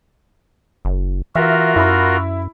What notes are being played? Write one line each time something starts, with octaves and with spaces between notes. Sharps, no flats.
F#1
E3 F4 F#4 A#4 E5
F#2 E4 B5